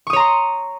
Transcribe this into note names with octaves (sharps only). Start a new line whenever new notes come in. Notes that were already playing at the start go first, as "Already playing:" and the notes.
C#5 A#5 C6 C#6 D#6